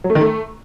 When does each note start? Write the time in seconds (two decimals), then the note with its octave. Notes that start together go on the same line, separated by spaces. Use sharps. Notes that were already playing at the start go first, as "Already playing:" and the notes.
0.04 F#3
0.10 A3
0.15 D#3
0.21 A3